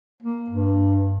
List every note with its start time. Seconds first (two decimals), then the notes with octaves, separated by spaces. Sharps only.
0.22 A#3
0.50 G2